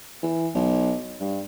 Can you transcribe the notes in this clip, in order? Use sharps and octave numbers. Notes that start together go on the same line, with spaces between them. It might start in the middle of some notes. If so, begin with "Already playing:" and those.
E3
B1
G2